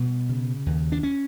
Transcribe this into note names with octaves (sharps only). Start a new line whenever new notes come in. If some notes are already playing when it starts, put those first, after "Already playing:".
Already playing: B2 G3
C#3
D#2
D4
C#4